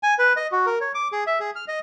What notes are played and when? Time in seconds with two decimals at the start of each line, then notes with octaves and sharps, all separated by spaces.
0.03 G#5
0.19 B4
0.36 D#5
0.52 F#4
0.66 A#4
0.81 C#5
0.95 D6
1.12 G#4
1.27 E5
1.40 G#4
1.56 F6
1.68 D#5